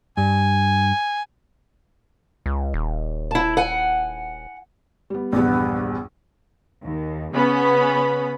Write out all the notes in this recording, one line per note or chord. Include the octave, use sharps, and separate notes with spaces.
G2 G#5
C#2
D#1
E4 A5
F#5 G#5
G3 B3
A#1 E2 G2 B3
D#2
C#3 B3 C#4 B5